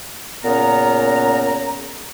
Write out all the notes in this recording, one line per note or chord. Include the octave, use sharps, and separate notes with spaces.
A#2 C#3 B3 C#4 A#5